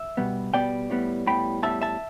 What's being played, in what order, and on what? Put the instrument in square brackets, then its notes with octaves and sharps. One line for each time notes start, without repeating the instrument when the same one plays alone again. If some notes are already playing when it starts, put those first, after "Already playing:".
Already playing: [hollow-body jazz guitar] E5
B2 G3 B3
B2 G3 B3 D5 G5
A2 G3 B3
A2 G3 B3 G5 B5
A2 G3 B3 E5 A5
E5 A5